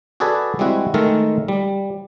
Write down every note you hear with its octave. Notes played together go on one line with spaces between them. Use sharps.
F#4 G#4 A4 B4 D5 G#5
G3 G#3 C4 E4 F#4
D#3 G#3 A3 A4 A#4
G3